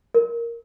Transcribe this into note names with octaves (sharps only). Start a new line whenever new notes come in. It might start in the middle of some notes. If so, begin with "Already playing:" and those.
A#4